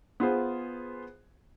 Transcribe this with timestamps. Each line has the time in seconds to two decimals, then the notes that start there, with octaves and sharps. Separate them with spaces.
0.20 B3 F4 G#4 C5